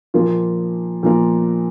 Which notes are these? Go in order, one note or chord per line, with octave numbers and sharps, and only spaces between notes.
A#2 F3 A#3 F4 A#4
A#2 F3 A#3 F4 A#4